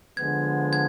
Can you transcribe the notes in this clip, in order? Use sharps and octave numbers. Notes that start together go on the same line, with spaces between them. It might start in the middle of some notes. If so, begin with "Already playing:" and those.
D3 F3 G#3 B3 G#6
G#6